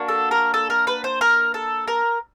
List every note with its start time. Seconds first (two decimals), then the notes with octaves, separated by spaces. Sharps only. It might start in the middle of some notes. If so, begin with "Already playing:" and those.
Already playing: A#3 D4 F#4
0.08 A4
0.31 A#4
0.54 A4
0.70 A#4
0.87 B4
1.04 C5
1.21 A#4
1.54 A4
1.88 A#4